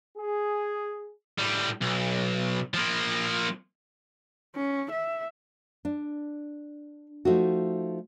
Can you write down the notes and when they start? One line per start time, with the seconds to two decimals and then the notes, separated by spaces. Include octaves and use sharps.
0.17 G#4
1.39 A2 G3
1.81 B1
2.74 F3 A#3
4.56 C#4
4.91 E5
5.85 D4
7.25 F3 A3 D#4 F#4